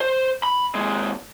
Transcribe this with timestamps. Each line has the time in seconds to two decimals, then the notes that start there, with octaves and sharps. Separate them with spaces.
0.01 C5
0.43 B5
0.75 D#2 G#3